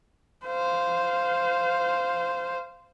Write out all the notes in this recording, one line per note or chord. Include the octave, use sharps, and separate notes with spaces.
C5 F5